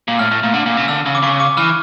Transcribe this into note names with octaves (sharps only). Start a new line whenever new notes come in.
A#2
A2 F6
A2
A#2
D3
A#2
C#3
D3 E6
C#3
D6
C#3 C#6
D6
E3 F6